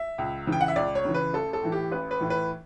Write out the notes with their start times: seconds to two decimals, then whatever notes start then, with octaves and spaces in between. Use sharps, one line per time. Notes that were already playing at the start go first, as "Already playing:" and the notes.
Already playing: E5
0.18 C#2
0.47 C#3 E3
0.52 G5
0.61 F#5
0.68 E5
0.76 C#2 D5
0.95 C#5
1.05 C#3 E3
1.14 B4
1.34 A1 A4
1.53 A4
1.62 A2 E3
1.72 G4
1.92 A1 B4
2.11 B4
2.21 A2 E3
2.30 B4